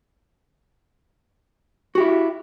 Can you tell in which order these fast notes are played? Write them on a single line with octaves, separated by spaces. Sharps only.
F#4 G4 E4